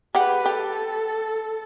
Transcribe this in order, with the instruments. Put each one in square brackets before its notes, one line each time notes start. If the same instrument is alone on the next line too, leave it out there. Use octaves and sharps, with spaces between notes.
[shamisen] G4 F#5 [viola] G#4 B4
[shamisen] G4 [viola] A4